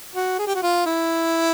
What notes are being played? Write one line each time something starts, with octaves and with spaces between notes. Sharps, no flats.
F#4
G#4
G4
F#4
F4
E4